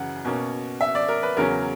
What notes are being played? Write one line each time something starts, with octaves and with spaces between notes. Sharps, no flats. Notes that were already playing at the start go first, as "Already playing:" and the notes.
Already playing: F#2 C#3 E3 F#5
B2 A#3 C#4
E5
D5
A#4
B4
E2 C#3 F#3 C#4 A#4